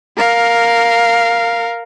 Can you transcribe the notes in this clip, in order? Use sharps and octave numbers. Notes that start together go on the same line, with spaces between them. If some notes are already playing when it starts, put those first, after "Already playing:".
A#4 F5